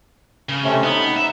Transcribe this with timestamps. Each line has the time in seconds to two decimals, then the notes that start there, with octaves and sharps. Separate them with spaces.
0.49 C#3
0.64 C3 A3 C#4
0.84 B3 D#4
1.16 E5